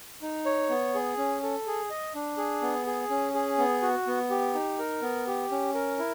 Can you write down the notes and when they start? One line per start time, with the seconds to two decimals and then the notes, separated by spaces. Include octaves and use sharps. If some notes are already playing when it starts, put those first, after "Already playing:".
0.22 D#4
0.45 C#5
0.69 B3
0.95 G#4
1.17 C#4
1.43 A4
1.67 G#4
1.90 D#5
2.15 D4
2.38 G#4
2.62 B3
2.87 G#4
3.10 C#4
3.34 G#4
3.58 B3
3.82 F#4
4.07 B3
4.30 G4
4.54 D#4
4.79 A#4
5.02 B3
5.27 G4
5.51 C#4
5.75 A#4
5.98 E4